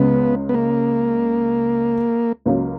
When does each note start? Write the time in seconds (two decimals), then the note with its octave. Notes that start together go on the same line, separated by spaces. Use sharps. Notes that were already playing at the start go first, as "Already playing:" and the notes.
Already playing: C#2 C#3 G#3 B3 C#4
0.49 B3
0.54 A#3
2.46 C#2 C#3 F#3 A#3 C#4